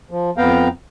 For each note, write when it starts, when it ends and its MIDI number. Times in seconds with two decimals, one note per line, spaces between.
0.11 0.30 53
0.37 0.68 41
0.37 0.68 59
0.37 0.68 77
0.37 0.68 79
0.37 0.68 82